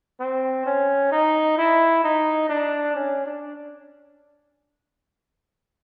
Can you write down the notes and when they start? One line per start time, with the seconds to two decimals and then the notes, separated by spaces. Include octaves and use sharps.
0.20 C4
0.66 C#4
1.12 D#4
1.58 E4
2.04 D#4
2.49 D4
2.95 C#4
3.26 D4